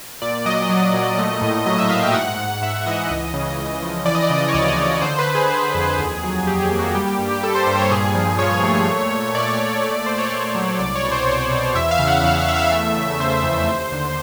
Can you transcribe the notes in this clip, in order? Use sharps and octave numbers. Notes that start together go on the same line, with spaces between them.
A#2 D5
F#3 D#5
F#3
A#2
A3
A2
F#3 D#5
E5
A3 F5
G5
G#2 F#5
G#2
G#2 E5
E3 D#5
C#2
C#3
C#2
F3
E3 D5
D#5
D5
C#3
C#5
D2 D5
C#3 D5
D3 C5
B4
D3
G#4
D3
F2
D#2
F#3
D#2 G4
G4
A#3
F#4
G3 G4
G4
G2
G4
G3 A4
C5
G2 C5
C#5
A#2 G#4
F3
F3 C#5
A3
A#2
A#2
A#2 D5
A#2
A3
A3 C5
C#5
A3 D5
F#3
C2 D5
C#5
B2
C5
C2 C#5
B2
E2 E5
F5
C#3
F#5
E2 F5
E2 E5
F5
E5
A3
C#3
C#3 C5
F2
D#2
D3